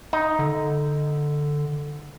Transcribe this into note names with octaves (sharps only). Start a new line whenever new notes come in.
D#4
D3